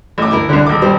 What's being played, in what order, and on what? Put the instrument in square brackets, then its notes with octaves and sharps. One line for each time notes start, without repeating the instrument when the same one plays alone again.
[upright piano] A1 D6 [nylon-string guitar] A3
[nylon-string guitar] D2 E4 A#4
[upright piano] C2 D3
D#1 D6
[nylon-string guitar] D#2 G3 C5